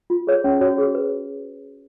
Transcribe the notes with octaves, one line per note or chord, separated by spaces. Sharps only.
F4
G#4 C#5
C#4
F#4 C#5
G#4
B4